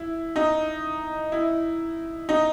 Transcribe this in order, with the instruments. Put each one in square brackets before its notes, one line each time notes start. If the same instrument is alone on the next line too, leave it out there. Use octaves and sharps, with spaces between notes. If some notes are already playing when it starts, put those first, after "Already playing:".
Already playing: [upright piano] E4
D#4
E4
D#4